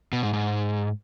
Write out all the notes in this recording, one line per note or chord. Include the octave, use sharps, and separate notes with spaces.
B2
G#2
G#2